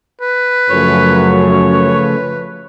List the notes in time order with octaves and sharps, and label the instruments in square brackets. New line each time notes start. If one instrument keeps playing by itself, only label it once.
[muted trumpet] B4
[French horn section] F#2 [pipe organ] C#3 F3 A3 [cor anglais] C#5
[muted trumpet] B4